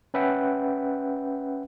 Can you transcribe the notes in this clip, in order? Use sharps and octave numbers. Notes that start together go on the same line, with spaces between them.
C#4 B4 E5 F#5 G5